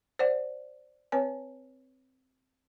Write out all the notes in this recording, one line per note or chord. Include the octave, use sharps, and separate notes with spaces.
C5 D5 F#5
C4 B4 C#5 G#5